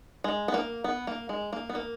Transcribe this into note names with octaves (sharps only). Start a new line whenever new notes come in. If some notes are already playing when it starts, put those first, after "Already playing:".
G#3
B3
A#3
B3
A#3
G#3
A#3
B3
A#3